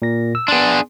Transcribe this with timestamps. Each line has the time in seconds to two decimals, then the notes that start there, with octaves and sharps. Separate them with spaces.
0.02 A#2 A#4 A#6
0.35 E6
0.48 B3 D4 G#4 C6